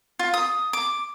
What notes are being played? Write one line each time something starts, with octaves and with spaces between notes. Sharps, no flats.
F4
D#6
D6